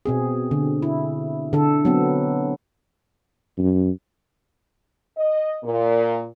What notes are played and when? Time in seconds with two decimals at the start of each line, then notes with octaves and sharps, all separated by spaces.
0.06 B2 C4 G#4
0.51 D3
0.82 E4
1.53 D3 A4
1.85 F#3 B3 C4
3.58 F#2
5.17 D#5
5.63 A#2